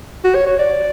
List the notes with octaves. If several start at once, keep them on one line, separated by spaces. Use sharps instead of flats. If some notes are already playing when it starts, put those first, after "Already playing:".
F#4
C#5
C#5
D5